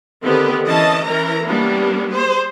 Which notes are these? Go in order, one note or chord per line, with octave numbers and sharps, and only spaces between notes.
D3 D#3 B3 C4 G4 B4
E3 C#4 D#5 A5
E3 C#4 A#4 A#5
G3 A#3 B3 C#4 D4
G#4 C5